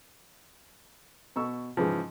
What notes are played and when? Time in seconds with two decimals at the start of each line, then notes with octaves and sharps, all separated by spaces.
1.36 B2 C#6 E6
1.77 G#2 C#3 E3 F3